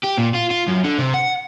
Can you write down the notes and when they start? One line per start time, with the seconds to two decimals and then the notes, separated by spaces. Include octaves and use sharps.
0.03 G4
0.18 A#2
0.34 F4
0.50 F4
0.68 F#2
0.84 D3
0.98 C3
1.14 F#5